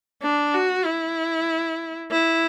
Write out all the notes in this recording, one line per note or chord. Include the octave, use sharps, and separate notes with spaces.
D4
F#4
E4
E4